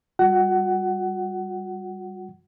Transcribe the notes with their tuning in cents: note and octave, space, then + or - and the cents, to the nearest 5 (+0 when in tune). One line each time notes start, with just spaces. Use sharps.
G3 +0 F#4 -40 F#5 +20